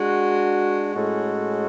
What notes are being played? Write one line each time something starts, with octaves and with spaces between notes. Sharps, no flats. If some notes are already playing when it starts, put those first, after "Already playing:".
Already playing: G#3 D4 F#4
A2 G#3 C#4 F#4 A4